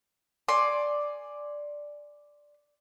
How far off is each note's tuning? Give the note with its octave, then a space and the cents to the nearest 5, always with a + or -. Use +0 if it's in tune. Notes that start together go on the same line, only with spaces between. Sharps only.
D5 +0 G#5 +0 C6 +15